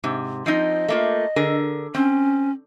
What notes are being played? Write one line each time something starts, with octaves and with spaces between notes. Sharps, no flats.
G#2 C3
F3 C4 D#4 D#5
A3 A#3 F4
D3 G#4 A#4
C4 C#4